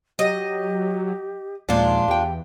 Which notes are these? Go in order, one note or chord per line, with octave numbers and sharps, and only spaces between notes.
F#3 G4 D#5
D#2 A#2 F3 G#3 D4 F4
E2 G4 G5